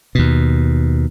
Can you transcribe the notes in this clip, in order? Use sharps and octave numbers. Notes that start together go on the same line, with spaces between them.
D#2 B2